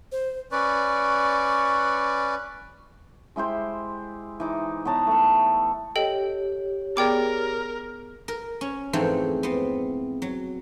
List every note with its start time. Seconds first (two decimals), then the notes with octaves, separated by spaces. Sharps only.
0.12 C5
0.52 C#4 B4 D5 C#6
3.36 G#3 E4 G4 C5
4.40 E3 D#4 D6
4.85 B3 C#5 A5 A#5
5.07 A3 A4
5.96 G4 A4 C#5 D#5 G5
6.97 B3 G#4 A#4 D5 G5 D6
8.28 A#4
8.61 C#4
8.93 F2 G#2 E3 A3 C4
9.43 B3 C4
10.22 F#3